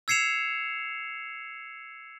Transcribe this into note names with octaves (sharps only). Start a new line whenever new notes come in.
E6 G#6 C7 C#7 E7 F7